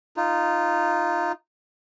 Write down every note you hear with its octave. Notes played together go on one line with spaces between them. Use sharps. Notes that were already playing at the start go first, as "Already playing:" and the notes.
D#4 F4